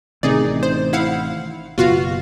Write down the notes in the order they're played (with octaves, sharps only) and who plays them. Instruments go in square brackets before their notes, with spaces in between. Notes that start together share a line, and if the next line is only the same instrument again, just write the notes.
[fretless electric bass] A1 C3 D#3 [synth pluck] D#4 G#4 D5
[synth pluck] C5
E4 F5 F#5
[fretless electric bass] F#1 B2 [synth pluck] F4 F#4 F5